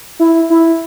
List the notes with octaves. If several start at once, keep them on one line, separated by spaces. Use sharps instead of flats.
E4
E4